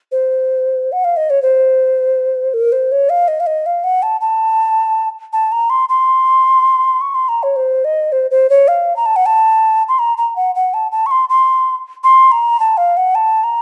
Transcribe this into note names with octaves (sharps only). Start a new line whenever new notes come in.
C5
F#5
F5
D#5
C#5
C5
A#4
C5
C#5
F5
D#5
F5
D#5
F5
F#5
A5
A5
A5
A#5
C6
C6
C#6
C6
A#5
C#5
C5
D#5
C5
C5
C#5
F5
A#5
A5
F#5
A5
C6
A#5
A#5
F#5
F#5
A5
A5
C#6
C6
C6
C6
A#5
A5
F5
F#5
A5
A#5